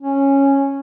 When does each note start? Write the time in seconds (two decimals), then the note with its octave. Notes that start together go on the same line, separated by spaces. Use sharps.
0.02 C#4